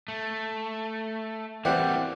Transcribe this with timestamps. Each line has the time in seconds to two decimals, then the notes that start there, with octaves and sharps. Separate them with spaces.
0.08 A3
1.65 E3 G3 A#3 C4 G4 D5 F#5